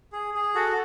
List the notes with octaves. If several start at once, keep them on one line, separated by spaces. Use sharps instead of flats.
G#4
G#4
F#4 A4